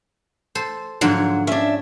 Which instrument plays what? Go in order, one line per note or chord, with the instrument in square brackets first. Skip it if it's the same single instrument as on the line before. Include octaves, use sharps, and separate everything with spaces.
[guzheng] A4 C5
[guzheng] G#2 D3 F3 [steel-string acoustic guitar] F#3
[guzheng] C#4 [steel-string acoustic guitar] D4 E5